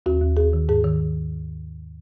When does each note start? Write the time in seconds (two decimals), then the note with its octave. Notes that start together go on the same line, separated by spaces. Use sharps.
0.06 D#2 F#4
0.21 D#2
0.37 D#2 G#4
0.53 D#3
0.69 G#2 G#4
0.84 D#3